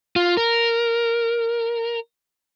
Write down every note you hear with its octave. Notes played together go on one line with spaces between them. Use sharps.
F4
A#4